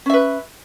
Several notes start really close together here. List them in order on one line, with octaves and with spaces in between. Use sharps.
C#4 E5 B4